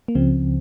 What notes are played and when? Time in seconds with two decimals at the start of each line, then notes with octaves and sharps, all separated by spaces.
0.08 A#3
0.15 C#2 C#3 F3 C4